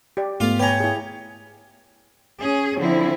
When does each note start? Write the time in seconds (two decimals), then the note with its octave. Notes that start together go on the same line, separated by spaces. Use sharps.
0.17 G4 D5
0.40 G#2 A3 B3 F4 D6
0.59 G4 B4 C#5 G#5 A#5
0.80 E4 G#4
2.40 C#4 G#4
2.78 D3 F3 C4 E4